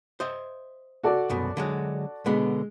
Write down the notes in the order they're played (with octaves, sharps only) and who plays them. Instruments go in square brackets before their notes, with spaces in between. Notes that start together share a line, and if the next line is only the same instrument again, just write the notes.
[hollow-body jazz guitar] C5 D#5 E5
[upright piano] F#4 A4 D5
[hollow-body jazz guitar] C2 F#2 B2
D3 F#3 G#3
[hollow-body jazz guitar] B2 D3 B3 [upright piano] G#3